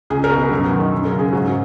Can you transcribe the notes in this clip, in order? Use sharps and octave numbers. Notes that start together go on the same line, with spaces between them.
C#2 G#4
A#4
B2
B4
F#2
D#3
F#2
A#4
C#3
G#4
G#2 F#4